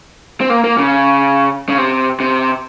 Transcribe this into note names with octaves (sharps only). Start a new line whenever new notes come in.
C4
A#3
A#3
C#3
C#3
C3
C3